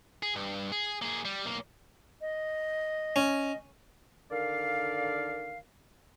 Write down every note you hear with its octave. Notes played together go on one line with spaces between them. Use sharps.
G#4
G2
G#4
A#3 G#4
G3
B1 A#3
D#5
C#4
D3 D#3 A#4 D5 F5